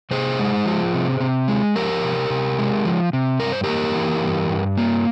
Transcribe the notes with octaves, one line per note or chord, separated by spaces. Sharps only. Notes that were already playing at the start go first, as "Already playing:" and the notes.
C3 G#4 C5
G#3
F3
C3
C3
G#3
F3 G4 A#4
C3
C3
G#3
F3
C3
G2 A#4
C5
A#3 G4 A#4
E3
G2
G2
A#3